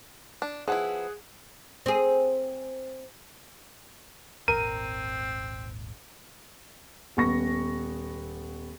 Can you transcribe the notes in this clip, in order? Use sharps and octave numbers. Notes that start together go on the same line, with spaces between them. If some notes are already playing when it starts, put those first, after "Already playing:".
D4
F3 B3 E4 G#4 F#5
C4 G#4
D#1 G#1 C4 A#4 D#7
D#1 B3 C#6 A#6